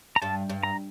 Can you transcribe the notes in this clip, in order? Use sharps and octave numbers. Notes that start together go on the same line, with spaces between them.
A#5
G2 A5
G2
A#5